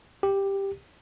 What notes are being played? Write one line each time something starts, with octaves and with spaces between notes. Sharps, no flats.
G4